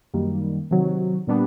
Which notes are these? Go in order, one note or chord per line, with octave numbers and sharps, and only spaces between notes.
F#2 D#3 G3 A#3
C3 D#3 F#3
A#2 G3 B3 D4